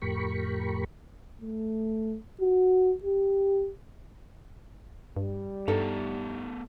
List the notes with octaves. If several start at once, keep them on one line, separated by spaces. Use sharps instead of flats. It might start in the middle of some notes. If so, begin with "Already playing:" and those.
F2 A2 G4 A#4 B5 C#6
A3
F#4
G4
G2 G3
G2 A3 B3 D#4 A4 A#5